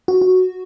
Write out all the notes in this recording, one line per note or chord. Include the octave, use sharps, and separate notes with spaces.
F#4
F#4